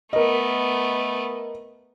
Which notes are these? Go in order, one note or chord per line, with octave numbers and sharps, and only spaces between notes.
A3 B3 A#4 D#5